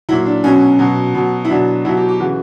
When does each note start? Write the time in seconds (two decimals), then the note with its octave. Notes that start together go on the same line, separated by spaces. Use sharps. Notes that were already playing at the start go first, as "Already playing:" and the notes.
0.09 F#3 E4
0.11 A#2
0.26 D4
0.44 B2 F#3 C#4
0.79 B2 F#3
1.14 B2 F#3
1.45 E4
1.49 B2 F#3 D4
1.85 B2 F#3 E4
1.97 G4
2.08 G4
2.20 C#3 E3 F#4